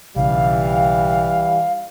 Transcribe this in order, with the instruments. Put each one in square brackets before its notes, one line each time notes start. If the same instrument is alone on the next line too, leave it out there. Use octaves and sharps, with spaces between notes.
[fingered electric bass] B1 C#3 [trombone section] E3 G3 [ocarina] F5